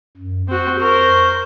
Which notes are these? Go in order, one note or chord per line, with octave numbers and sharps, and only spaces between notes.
F#2
F2 C4 F#4
A#4 C5 C#6